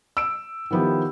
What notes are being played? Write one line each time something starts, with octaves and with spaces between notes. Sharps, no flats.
E6 D7
D#3 F3 B3 E4 G4